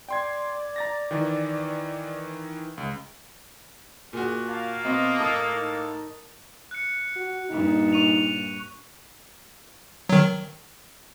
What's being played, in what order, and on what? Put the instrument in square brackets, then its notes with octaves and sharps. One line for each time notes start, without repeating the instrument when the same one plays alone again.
[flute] D5 [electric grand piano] G5 C6 G#6
[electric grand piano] A#5 A6 A#6
D#3 E3
C#2
[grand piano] A#2 F#4 [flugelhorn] G#4
[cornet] A#3 [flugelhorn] F5 [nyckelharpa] A5
[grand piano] B2 C4 [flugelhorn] D#5
[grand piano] A2 A4 D#6 [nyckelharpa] A#4 A5
[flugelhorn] D#4
[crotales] F#6 C#7
[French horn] F#4
[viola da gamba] G2 A#2 [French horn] D#4
[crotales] C#6 D#7 F7
[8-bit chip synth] D#3 F#3